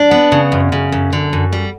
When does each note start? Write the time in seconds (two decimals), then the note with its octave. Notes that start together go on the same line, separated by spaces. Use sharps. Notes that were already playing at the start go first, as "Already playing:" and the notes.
Already playing: D4
0.11 B3
0.32 C#3
0.52 F#2
0.72 C#3
0.92 F#2
1.13 D3
1.33 F#2
1.53 G3